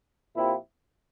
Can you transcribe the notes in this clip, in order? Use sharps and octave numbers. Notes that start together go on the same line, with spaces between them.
A#2 F3 C4 E4 G4